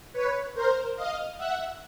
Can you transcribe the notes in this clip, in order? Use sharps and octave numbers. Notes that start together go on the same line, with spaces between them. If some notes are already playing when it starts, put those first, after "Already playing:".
B4 C#5
A#4 C5
D#5 F5
E5 F#5